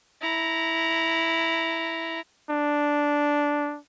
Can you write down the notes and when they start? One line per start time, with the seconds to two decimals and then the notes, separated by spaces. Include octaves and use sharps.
0.22 E4 A#5
2.50 D4